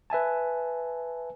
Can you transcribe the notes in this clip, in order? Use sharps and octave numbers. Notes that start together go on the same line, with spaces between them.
B4 E5 G#5 A5